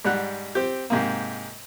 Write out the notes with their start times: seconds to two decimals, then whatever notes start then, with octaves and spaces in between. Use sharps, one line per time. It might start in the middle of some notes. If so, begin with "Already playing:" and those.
0.05 G#2 G3 F#5 F#6
0.55 C4 G4
0.90 G#2 C3 A#3